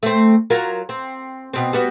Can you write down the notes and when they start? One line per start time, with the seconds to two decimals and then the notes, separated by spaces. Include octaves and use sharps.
0.03 A3 C4
0.50 F#3 F4 A#4
0.89 C4
1.54 B2 C4
1.73 G3 B3 F#4